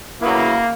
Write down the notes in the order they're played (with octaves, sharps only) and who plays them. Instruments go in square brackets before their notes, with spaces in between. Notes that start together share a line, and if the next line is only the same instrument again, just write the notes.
[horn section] C#3 F#3 B3 E4 [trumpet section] A#3